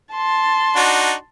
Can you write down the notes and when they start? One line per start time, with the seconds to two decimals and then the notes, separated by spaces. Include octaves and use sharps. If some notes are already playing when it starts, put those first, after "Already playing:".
0.13 A5 C6
0.76 D4 D#4 F#4